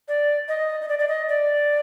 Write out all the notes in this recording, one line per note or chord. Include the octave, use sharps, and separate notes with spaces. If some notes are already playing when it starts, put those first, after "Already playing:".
D5
D#5
D#5
D5
D5
D#5
D5